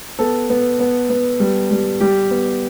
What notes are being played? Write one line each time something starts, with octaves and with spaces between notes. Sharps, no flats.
B3 A4
B3
B3
B3
G3
G3
G3 G4
B3